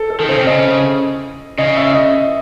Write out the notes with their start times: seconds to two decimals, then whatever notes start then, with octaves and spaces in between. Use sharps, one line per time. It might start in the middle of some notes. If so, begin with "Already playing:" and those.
Already playing: A4
0.10 A4
0.20 D#3
0.29 C#3 C5
0.39 C3
0.47 C#3 D#5
1.58 C#3 D#5
1.77 E5
1.95 D#5